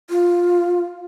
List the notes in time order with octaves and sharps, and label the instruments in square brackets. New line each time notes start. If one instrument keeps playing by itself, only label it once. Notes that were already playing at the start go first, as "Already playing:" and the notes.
[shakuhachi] F4